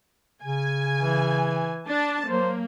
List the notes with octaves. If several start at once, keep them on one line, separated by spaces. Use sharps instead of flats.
C#3 G#5
E3
D4 A5
F#3 A#3 C5